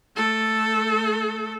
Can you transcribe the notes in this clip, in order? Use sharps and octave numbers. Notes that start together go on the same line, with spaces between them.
A3 A4